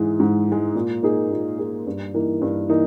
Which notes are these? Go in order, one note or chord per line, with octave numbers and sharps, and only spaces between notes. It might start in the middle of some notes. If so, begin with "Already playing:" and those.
Already playing: G#2 E3 G#3
G#2
E3 G#3
A#2
A#3 D#4 G#4
A#2
A#3 D#4 G#4
G2
E3 A#3 D#4
G2
E3 A#3 D#4